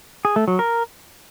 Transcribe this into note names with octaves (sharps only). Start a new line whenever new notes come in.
G#4
A3
F#3
A#4